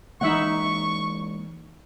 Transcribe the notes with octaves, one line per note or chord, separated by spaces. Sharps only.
E3 G#3 A#3 D#4 E5 F#5 C#6